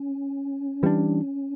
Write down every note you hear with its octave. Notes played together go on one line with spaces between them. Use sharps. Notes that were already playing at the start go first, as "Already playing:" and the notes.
Already playing: C#4
E3 G3 B3 D4